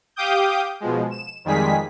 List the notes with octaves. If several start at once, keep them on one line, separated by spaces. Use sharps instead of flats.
G4 F5 G5 D6 D#6 G6
B2 F3 G#3
E7
F2 D#3 G3 G#3 G#4 B6